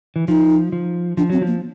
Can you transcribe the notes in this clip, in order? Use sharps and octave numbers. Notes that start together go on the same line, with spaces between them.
E3
F3 D#4
F3
F3 D4
F#3 C4
F3
A#3